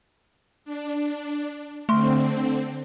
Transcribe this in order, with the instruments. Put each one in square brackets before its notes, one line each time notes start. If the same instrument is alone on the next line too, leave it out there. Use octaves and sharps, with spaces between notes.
[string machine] D4
[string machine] D3 C4 [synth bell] A3 C6